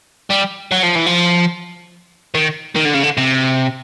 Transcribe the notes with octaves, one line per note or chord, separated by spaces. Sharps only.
G3
F#3
F3
E3
F3
D#3
D#3
D3
C#3
D3
C3